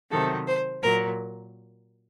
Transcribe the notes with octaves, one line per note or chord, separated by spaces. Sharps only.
C3 D#3 F#3 A4
C5
A#2 F#3 A#4